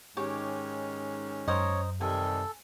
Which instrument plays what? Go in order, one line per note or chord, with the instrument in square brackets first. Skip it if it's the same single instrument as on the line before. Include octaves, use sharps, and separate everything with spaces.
[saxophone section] G#2 D#3 C#4 [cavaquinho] G4 C#5
[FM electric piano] F#2 [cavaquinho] A#4 C5 D#5 [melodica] C#5
[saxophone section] C3 D#3 G3 [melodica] A4 [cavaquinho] G#5